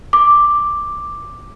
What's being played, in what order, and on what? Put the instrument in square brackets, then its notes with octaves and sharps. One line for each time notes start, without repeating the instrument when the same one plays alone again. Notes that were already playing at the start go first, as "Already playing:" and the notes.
[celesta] D6